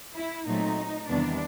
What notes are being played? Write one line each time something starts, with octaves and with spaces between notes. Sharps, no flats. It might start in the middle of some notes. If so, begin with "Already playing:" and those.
E4
A#2 F#3 A3 C4 D#4
E2 C3 D#3 G3 B3 D4